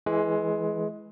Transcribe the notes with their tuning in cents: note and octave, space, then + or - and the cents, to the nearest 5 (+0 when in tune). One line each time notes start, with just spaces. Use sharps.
E3 +0 G#3 +20